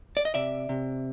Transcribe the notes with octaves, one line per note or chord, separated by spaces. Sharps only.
D5
D#5
C3 D5 E5
C3